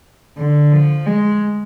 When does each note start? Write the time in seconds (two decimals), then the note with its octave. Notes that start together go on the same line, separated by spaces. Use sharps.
0.38 D3
0.72 F3
1.06 G#3